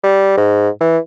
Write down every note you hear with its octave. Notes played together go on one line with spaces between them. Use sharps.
G3
G#2
E3